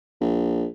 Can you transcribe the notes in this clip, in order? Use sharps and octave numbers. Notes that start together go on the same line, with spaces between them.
A#1